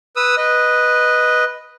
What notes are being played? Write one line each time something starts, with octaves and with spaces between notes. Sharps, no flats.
B4 D#6 E6
B4 D#5